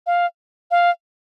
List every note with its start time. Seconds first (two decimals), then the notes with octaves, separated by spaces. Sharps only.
0.07 F5
0.71 F5